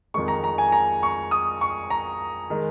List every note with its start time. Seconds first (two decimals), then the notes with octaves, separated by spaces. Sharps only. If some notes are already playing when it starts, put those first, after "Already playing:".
0.14 F2 D#3 G#3 C#6
0.28 A#5
0.44 A#5
0.58 G#5
0.72 A#5
1.03 C#6
1.31 D#6
1.61 C#6
1.90 A#5
2.50 D#3 G#3